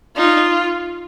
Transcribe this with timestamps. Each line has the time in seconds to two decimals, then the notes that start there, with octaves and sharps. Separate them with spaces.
0.16 D#4 F4